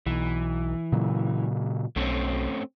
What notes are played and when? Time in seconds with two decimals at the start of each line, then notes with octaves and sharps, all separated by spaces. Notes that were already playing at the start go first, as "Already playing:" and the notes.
0.06 B1 E3
0.92 A#2 C#3 F#3
1.96 B1 A3 C4 C#4